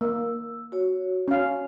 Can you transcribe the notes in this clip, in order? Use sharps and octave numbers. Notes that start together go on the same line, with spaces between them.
A#3 E6
F#4 C#5
C#4 F5